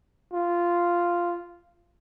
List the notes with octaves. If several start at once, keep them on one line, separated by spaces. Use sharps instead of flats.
F4